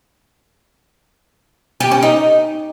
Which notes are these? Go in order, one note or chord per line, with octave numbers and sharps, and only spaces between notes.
G4
C#4
D#4